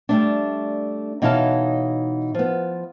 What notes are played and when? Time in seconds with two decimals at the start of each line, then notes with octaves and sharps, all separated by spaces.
0.09 G3 A3 D4
1.22 B2 E3 D#4 C#5 F5 A5
2.35 F3 B3